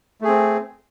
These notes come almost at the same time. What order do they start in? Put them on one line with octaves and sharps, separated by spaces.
A3 G#4 C4